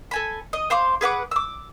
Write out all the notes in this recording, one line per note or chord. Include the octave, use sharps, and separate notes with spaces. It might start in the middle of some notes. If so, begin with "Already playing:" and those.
A4 G#5 B5
D#5
C5 F5 C6 D6
G#4 B4 F#5 D6
D6 E6